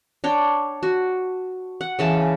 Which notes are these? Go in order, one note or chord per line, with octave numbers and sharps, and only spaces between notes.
D4 C#5 G5
F#4
F#5
C#3 E3 A5